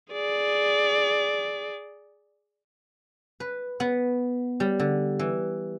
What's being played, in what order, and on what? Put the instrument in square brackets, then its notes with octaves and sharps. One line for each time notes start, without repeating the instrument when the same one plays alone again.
[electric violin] G#4 D5
[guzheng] B4
B3
G3
D3
E3